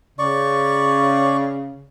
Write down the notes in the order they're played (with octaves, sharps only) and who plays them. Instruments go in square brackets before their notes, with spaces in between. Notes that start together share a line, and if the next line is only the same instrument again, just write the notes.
[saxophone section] C#3 [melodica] D5 C#6